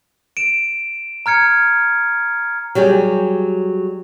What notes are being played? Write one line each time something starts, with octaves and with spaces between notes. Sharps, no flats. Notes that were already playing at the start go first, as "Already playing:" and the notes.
D7 E7
A#5 F6 G#6 C#7
F#3 G3 G4 G#4